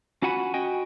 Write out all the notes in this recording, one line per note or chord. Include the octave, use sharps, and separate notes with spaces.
C#4 F4 F#4 F#5 G#5 B5
F#4 D#5 G5 G#5